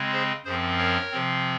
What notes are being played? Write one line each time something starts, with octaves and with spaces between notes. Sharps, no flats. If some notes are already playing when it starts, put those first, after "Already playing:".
Already playing: C#3 G#3 C4
G#4 C5
F#2 F3 C4 G#4 C5
A#4 C#5
C3 F3 C4